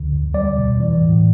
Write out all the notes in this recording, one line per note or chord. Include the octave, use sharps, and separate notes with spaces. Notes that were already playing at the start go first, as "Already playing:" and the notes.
Already playing: D2 D3
E2
G3 D5
B2
E3
A2